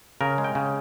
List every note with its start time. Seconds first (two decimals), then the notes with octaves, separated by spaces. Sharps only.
0.21 C#3 A#4
0.38 G#3
0.44 G5
0.55 C#3